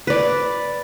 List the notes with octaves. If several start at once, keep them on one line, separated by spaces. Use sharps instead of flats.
B4 D5